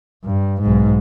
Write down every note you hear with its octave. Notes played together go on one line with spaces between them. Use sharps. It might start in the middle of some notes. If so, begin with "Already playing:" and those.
G2
B1 G#2